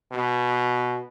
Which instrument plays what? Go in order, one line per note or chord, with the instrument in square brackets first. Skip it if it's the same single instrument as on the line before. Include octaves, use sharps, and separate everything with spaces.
[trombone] B2